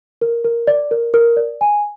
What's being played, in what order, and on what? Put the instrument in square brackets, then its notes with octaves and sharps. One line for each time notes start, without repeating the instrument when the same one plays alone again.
[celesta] A#4
A#4
D5
A#4
A#4
D5
G#5